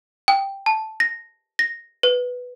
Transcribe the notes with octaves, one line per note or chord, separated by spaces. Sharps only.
G5
A5
A#6
A#6
B4